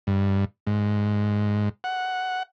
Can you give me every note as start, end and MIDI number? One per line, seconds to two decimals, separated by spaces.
0.07 0.45 43
0.67 1.69 44
1.84 2.43 78